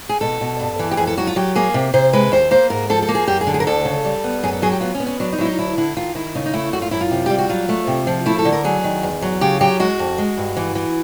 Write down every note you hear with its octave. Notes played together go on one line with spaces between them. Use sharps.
G#4
B2 A4
B2
G2
E3
G4
F2 G#4
A4
F#3 F#4
F4
F#3 G4
A#3 G#4
C3
C3 C5
G#3 B4
D#2 C5
A#3 C5
G#2 A#4
F3 A4
A4
A#3
G#4
F#2 G4
G#4
D3
G#4
A#4
D2 A4
C#3
G3
B3
F#2 G#4
A4
F#3 G#4
G4
B3 F4
C#4
B3
C#4
F#3 D4
D#4
F#3 E4
D#4
D2 E4
D3 E4
D#3 F4
D#3 E4
C#3 D#4
D#4
A3 E4
F#2 F#4
F4
F#2 E4
F4
C3
G3 G4
F#4
F#3 F4
A3
C3
F3
A3 E4
A4
D3
A#4
F#3 G#4
D#3
E2
F#3
C#3 G4
F#3 G4
G#3 F#4
F2
G#3
G2
E3
E3